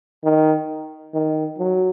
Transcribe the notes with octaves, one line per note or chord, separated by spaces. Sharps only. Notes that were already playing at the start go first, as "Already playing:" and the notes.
D#3
D#3
F#3